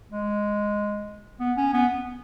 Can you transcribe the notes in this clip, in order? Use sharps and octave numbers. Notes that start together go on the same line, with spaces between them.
G#3
B3
C#4
B3